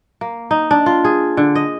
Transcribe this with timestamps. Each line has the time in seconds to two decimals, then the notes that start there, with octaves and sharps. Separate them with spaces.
0.21 A#3
0.51 D#4
0.71 D4
0.86 F4
1.04 G#4
1.37 D3
1.55 D#5